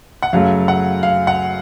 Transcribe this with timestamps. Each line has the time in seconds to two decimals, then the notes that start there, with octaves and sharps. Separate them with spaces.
0.23 F#5
0.33 F#2 C#3 F#3 A3 F5
0.68 F#5
1.03 F5
1.27 F#5